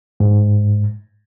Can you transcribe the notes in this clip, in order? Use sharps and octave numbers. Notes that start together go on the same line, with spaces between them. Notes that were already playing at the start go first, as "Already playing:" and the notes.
G#2